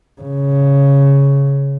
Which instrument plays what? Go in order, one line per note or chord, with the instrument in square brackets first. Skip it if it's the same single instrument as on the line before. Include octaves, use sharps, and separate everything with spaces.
[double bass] C#3